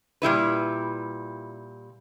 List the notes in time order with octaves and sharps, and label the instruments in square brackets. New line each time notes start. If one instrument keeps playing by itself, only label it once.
[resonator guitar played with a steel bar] A#2 G3 E4 B4